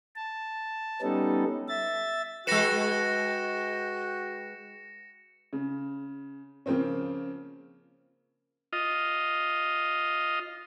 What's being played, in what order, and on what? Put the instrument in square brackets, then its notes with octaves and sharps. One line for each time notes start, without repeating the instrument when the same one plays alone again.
[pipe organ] A5
G3 B3 C#4 D#4 A4
E5 A6
[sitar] G#3 B4 [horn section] F#4 G5 [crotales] A#6 C#7 E7
[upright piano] C#3
C#3 F3 A#3 C4 C#4
[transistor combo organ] F4 D#5